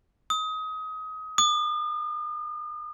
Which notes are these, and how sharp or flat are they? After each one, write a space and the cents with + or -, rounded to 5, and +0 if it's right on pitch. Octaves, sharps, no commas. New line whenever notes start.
D#6 +25
D#6 -45